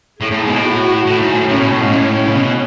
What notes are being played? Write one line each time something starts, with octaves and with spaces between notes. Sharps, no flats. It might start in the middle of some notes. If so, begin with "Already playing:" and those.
A2 G#4
A2
G#2
B2
A2
F#4
A2
G#2
A2
A2 C#4
B2
A2
G#2
A2
C#3
B2 C#4